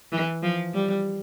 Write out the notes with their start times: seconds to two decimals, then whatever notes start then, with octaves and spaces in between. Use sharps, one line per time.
0.12 E3
0.43 F3
0.74 G3